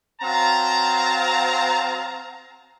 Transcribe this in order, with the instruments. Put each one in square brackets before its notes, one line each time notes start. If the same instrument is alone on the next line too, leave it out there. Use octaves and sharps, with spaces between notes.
[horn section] F#3 C4 F5 A5 A#5